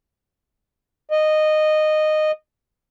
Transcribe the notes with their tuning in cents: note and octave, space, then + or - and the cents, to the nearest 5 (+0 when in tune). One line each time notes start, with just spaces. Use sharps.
D#5 -15